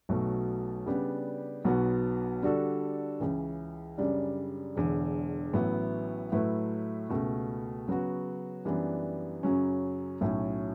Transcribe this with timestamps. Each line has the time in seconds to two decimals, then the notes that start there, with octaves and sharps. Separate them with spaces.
0.09 B1 B2 F#3 A3
0.86 C#3 G3 B3 D4 G4
1.65 B1 B2 F#3 B3 F#4
2.43 D3 G3 D4 F#4 A4
3.20 C#2 C#3 E3
3.98 F#2 C#3 G3 D4
4.76 E1 E2 D3
5.53 A1 A2 F#3 B3 E4
6.32 A2 F#3 A3 E4 B4
7.09 C#2 B2 A3
7.88 C#3 F#3 B3 F#4
8.65 F#2 E3 G3 B3 D4
9.43 F#2 C#3 F#3 C#4
10.21 B1 A2 F#3 C#4